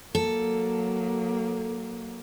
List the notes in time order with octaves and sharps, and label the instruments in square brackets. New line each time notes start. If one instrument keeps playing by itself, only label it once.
[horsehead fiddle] F#3 A#3 [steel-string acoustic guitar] A4